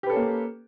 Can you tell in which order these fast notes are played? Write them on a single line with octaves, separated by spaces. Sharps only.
G4 B4 A4 C#4 A#3